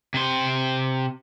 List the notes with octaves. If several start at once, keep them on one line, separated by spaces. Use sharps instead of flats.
C3 C5